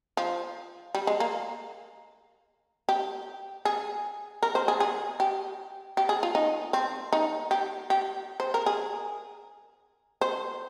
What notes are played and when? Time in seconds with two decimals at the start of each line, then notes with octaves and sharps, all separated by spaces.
0.17 F3
0.95 G3
1.07 G#3
1.20 A#3
2.89 G4
3.65 G#4
4.43 A#4
4.55 C5
4.68 G#4
4.80 G#4
5.20 G4
5.97 G4
6.09 G#4
6.23 F4
6.35 D#4
6.73 C4
7.13 D#4
7.51 G4
7.90 G4
8.40 C5
8.54 A#4
8.66 G#4
10.21 C5